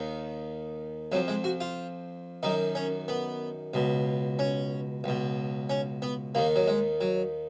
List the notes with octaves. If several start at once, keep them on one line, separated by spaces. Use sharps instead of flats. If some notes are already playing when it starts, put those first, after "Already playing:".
Already playing: D#2 D#3
F2 F3 F#3
G#3
F#4
F4
F#2 D#3 D#4
C#4
B3
C#2 B2
C#4
C#2 B2
C#4
B3
D#2 D#3 A#3
F#3
G#3
F#3